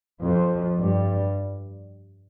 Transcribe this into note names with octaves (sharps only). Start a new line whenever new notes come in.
F2 F3
G2 G3